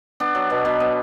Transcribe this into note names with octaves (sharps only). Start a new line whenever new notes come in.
B3 D4
F#3
B2
B2
B3